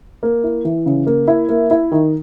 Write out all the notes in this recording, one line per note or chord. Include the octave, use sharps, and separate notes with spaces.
A#3
E4
E3
C#3
A#3
E4
A#3
E4
D#3